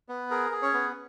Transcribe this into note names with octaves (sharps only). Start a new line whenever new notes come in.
B3
G#4 A#4
G#4
C#4 C#5
B3